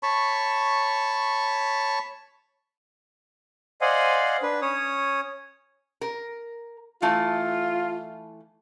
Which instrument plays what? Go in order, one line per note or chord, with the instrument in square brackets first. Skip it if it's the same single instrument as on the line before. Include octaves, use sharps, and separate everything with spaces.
[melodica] C#5 A5 B5 C#6
[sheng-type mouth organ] C5 D5 D#5 F5 F#5 G#5
D4 B4
C#4 C#5 D#6
[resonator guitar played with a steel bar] A#4
[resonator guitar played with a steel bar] E3 A3 E4 [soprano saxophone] F4